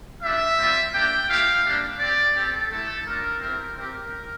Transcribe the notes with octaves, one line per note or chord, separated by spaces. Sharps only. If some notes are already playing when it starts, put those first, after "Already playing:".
G3 D4 F4 E5
G3 C4 F4
A#3 D4 G4 G5
A3 E4 G4 F5
G3 A#3 D4 G4
C4 G4 D5
C4 G4 A4
A3 E4 G4 A4
A3 D4 F4 A#4
C4 E4 G4 A#4
C4 G4 A#4